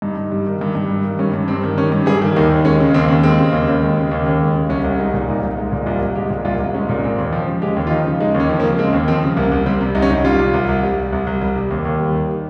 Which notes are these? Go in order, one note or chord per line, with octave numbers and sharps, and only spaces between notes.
G2 D#4
G2
G3
D#3
G2
G2
G3
D#3
G2 C#4
G2
G3 C4
D#3
G2 C#4
G2
G3 G#4
D#3
D#2 D#4
D#2
G#3 C#4
C#3
D#2 C4
D#2
G#3 C4
C#3
D#2
D#2
G#3
C#3
D#2
D#2
G#3
C#3
C2 C#4
C2
G#3 D#4
A#2
C2 D#4
C2
G#3
A#2
C2 F4
C2
G#3 G4
A#2
C2 F4
C2
G#3 C#4
A#2
G#3 C4
D#2
F3
C#3
G#3 G4
D#2
F4
F3 D#4
C#3
G#3 D#4
D#2
C#4
F3
A#3
C#3
G#3 C4
D#2
F3 C4
C#3
C2 A#3
C2
G3 C4
C3
C2 D#4
C#4
C2 D#4
G3 F4
C3
C2
C2
G3
C3
C2
C2
G3
C3
D#2
D#2
G3
D#3